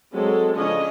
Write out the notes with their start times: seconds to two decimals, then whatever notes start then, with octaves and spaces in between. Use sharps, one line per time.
0.12 F#3 G#3 C4 A4
0.56 C#3 F3 G#3 C#4 D4 D#5